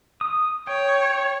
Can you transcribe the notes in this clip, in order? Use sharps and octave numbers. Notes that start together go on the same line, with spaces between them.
D#6
C#5 G5